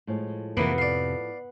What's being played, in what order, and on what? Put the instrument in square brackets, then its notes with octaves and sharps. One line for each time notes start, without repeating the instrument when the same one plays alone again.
[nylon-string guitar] A2 F3 G#3
[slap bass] F2 C3 [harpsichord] E3 A#3 [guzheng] B3
[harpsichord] D5 F5